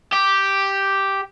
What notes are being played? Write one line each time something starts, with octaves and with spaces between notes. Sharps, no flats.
G4